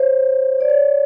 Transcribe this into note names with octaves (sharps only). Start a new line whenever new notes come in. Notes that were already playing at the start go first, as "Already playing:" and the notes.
Already playing: C5 C#5
D5
C#5